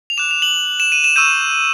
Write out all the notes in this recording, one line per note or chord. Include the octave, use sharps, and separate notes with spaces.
F7
D6 F#6 E7
F7
F#7
E7
D#7
E7
C#6 E6 G6 D#7